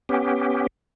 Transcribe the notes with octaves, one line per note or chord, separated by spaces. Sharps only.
B3 C#4 G4